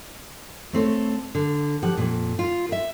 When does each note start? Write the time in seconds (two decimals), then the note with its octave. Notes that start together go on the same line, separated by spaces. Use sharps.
0.73 A3 C4 A4 C#5
1.35 D3
1.83 F3 G4 F#5
1.97 F2 A#2
2.39 F4
2.69 A#4 E5